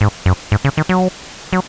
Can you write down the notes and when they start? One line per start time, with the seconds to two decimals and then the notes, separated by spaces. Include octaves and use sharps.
0.01 G#2
0.26 F#2
0.52 G#2
0.65 C#3
0.77 D#3
0.89 F#3
1.53 F#3